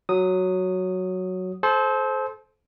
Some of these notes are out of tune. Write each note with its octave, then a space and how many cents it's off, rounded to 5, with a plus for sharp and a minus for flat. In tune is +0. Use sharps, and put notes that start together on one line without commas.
F#3 +0 D#6 +0
A4 -35 C5 +0